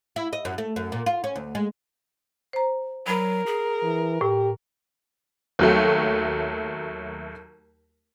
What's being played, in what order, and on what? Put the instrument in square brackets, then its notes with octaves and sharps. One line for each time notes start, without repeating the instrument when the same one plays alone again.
[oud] E4
D#5
F#2
A3
F#2
A#2
F4
C#4
D2
G#3
[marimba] C5 A#5
[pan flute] F#3 [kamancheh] A#4 [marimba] B5
[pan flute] G#4
[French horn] E3
[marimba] A2 [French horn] G4
[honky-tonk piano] D#2 F#3 A3